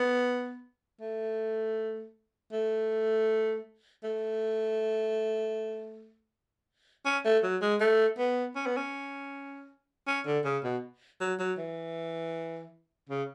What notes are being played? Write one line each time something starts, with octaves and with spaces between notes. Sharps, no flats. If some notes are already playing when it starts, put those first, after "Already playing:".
Already playing: B3
A3
A3
A3
C#4
A3
F#3
G#3
A3
B3
C#4
B3
C#4
C#4
D3
C#3
B2
F#3
F#3
E3
C#3